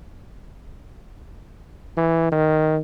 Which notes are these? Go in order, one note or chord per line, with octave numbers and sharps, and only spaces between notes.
E3
D#3